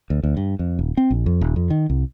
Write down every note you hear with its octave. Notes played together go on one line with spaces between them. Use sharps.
D2
D2
G2
F2
D#1
C4
A#1
F2
D#1
F2
D#3
C2